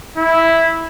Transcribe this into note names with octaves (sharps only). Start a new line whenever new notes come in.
E4